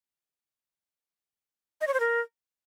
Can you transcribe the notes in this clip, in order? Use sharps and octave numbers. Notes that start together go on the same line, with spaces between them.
D#5
C#5
C5
A#4